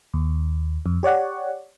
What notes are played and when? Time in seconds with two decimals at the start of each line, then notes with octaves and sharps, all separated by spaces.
0.14 D#2
0.86 F2
1.03 G4 C#5 D5 F#5